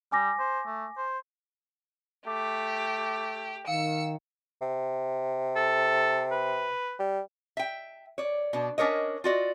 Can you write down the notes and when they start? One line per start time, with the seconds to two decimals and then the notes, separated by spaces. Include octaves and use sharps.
0.12 G3 G#5 D6 A#6
0.39 C5
0.66 A3
0.97 C5
2.26 A3 G4 D6
3.67 D#3 F5 E6 C#7
4.61 C3
5.56 A4
6.32 B4
6.99 G3
7.57 E5 G5
8.18 C#5 D5
8.53 B2 D4
8.78 C#4 D4 A#4 C#5 D#5
9.24 F4 F#4 D5 D#5